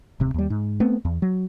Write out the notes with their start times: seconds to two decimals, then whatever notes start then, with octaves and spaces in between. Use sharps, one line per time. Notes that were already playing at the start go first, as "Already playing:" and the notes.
0.20 D1 C3
0.34 D#2 G3
0.50 G#2
0.80 A3 B3 C4
1.05 E2
1.22 F#3